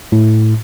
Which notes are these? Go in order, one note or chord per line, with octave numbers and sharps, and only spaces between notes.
A2